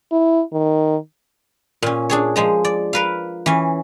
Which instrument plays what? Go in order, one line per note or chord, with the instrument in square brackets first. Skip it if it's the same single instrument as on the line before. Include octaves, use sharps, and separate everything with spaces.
[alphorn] E4
D#3
[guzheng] A#2 C#4
D4 G#4 C#5
F3 G#3 A#5
D5
A#4 B4 F5
E3 C#4